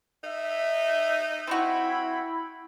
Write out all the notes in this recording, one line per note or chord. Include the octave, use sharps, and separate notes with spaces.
D#4 E5
C4 D4 E4 F#4 G5 B5